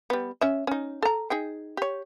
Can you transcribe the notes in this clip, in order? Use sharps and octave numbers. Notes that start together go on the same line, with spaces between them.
G3 B3
C#4 E5
C#4 D#4
A4 A#5
D#4 G#4 G5
G4 C#5